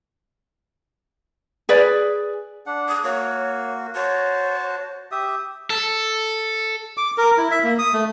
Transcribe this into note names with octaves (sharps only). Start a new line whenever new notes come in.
G#4 B4 D5
D4 F#5
D#6
A#3 F#4 C#5
F#4 C5 C#5 A5
G4 E5 D#6
A4
D6
A#4
E4
E5
A#3
D#6
A3